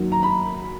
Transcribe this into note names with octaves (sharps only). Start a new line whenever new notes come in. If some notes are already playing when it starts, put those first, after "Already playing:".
Already playing: F#2 D#3 F#3 A#3
A#5
B5